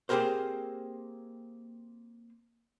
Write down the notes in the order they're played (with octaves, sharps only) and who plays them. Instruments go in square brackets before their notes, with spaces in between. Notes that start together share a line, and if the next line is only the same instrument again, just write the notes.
[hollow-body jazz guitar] A#3 C4 G4 G#4 A#4 C5